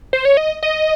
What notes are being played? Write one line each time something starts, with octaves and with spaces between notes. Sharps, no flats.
C5
C#5
D#5
D#5